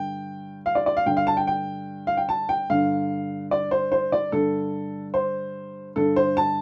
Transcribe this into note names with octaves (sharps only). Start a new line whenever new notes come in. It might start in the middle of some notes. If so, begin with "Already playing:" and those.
Already playing: G2 D3 G5
F5
D5
D5
F5
G2 D3 G5
F5
A5
G5
G5
F5
G5
A5
G5
G2 D3 F5
D5
C5
C5
D5
G2 D3 A4
C5
G2 D3 A4
C5
A5